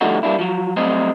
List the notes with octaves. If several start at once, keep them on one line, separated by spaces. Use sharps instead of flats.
D3 F3 G3 A3 D#4 F#4
G3 A#3 D4 E4
F3 F#3
F#3 G3 A3 C4 C5 D#5